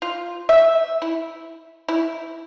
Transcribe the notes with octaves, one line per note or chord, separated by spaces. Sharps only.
F4
E5
E4
E4